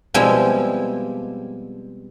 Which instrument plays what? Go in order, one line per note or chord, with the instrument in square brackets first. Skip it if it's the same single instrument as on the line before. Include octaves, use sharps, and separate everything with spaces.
[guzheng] B2 F3 G3 G#3 C4 E4